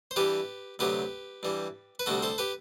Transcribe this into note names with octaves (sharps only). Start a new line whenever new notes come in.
C5
G2 E3 G3 G4 B4
D2 C3 F#3 G4 B4
G2 E3 G3
B4
D2 C3 G3 F#4 A4
A4 C5
G4 B4